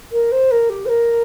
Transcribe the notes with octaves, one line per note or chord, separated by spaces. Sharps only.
A#4
C5
A#4
G4
C5
A#4